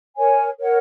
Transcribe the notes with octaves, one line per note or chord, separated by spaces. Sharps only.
A#4 C#5 G#5
A#4 C#5 F#5